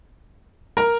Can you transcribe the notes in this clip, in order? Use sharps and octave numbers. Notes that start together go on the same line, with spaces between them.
A#4 A#5